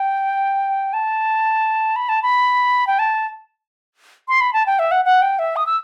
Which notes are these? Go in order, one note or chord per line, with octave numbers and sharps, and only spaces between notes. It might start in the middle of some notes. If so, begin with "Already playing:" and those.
Already playing: G5
A5
B5
A5
B5
G5
A5
C6
B5
A5
G5
E5
F#5
F#5
G5
E5
D#6
E6